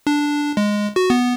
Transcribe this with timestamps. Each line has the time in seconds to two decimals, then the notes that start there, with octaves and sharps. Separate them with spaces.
0.07 D4
0.57 G#3
0.96 F#4
1.10 B3